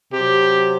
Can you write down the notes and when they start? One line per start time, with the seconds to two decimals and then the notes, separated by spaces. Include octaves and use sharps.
0.12 C3 F#3 G4